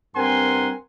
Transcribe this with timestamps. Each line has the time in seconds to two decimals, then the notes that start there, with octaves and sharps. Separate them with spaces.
0.15 G2 C4 A#4 F#5 G#5 C6